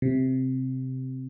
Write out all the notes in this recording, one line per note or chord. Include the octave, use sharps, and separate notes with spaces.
C3